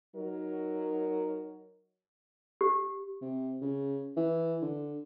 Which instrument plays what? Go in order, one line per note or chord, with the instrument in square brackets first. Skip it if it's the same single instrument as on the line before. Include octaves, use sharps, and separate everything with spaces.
[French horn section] F#3 D#4 A#4
[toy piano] G4
[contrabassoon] C3
C#3
E3
D3